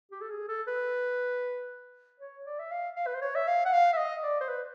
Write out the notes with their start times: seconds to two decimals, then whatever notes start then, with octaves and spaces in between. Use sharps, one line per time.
0.11 G4
0.21 A4
0.30 G#4
0.49 A4
0.68 B4
2.20 C#5
2.46 D5
2.59 E5
2.71 F5
2.96 F5
3.07 B4
3.15 C5
3.22 C#5
3.35 E5
3.47 F5
3.65 F#5
3.73 F5
3.93 E5
3.97 D#5
4.23 D5
4.41 C5
4.49 B4